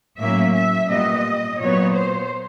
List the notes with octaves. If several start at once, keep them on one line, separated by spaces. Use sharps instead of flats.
A2 F#3 A#3 C#4 E5
E5
A#2 G3 B3 D#5
A#2 F#3 B3 C#5
C5